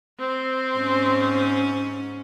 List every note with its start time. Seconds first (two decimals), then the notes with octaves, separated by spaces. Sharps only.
0.19 C4
0.77 G#2 C#4